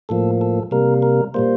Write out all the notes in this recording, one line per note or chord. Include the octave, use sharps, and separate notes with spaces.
A2 F3 A#3 A4
A4
C3 G3 A#3 A#4
A#4
A#2 G3 A#3 C5